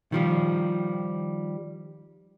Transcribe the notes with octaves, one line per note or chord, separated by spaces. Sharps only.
D#3 F3 G3